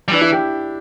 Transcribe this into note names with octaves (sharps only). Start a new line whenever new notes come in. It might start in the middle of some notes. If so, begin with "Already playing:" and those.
G3
E3 D4
E4
G4